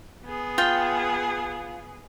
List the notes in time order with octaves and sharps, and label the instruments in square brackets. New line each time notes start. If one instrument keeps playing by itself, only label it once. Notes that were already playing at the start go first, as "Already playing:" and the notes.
[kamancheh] B3 G#4
[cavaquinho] F4 G5